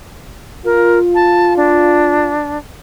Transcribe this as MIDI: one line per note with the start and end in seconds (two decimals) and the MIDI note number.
0.65 2.33 65
0.65 0.98 70
1.15 1.56 81
1.57 2.58 62